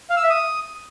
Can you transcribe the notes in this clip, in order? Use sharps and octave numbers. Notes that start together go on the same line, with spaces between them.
F5
E6
E5
D#6